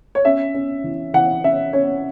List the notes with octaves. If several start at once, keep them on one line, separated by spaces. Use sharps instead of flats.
C#5
C#4 E5
C#4
E3
E3 F#5
C#4 E5
C#4 C#5